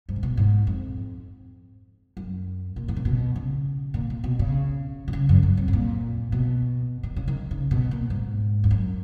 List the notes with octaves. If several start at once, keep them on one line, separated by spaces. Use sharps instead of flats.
G#2
C#3
B2
G#2
F2
F#2
A#2
D#3
C#3
B2
C#3
A#2
A#2
B2
C#3
B2
C#3
F#2
F#2
F2
G#2
A#2
B2
D#3
C#3
D#3
C#3
B2
A#2
G#2
F2
F#2